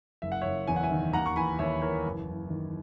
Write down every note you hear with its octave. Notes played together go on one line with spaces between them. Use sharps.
F#1 E5
F#5
F#1 C#5 E5
E2 G#5
F#5
E5 G#5
D#3
D#2 F#5 A#5
C#6
E3 G#5 B5
D#2 C#5 E5
E3 A#4 C#5
F#1
F#1
D#3